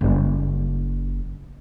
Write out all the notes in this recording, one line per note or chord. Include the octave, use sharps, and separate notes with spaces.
F#1 G3